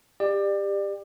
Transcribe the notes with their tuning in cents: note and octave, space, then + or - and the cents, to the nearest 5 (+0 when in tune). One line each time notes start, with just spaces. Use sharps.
G4 +20 D5 +25